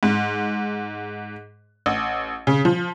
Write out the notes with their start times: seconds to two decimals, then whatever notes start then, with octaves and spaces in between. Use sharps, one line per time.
0.03 G#2
1.86 A1
2.47 C#3
2.65 F3